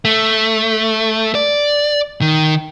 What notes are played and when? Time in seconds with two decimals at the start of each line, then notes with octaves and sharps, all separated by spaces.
0.05 A3
1.35 D5
2.21 D#3